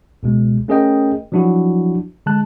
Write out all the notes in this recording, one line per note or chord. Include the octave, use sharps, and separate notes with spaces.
C#2 B2 G#3
A3 C#4 G#4 A#4 D#5 G5
F3 F#3 D4 E4 F#4
D3 G#3 A5 F#6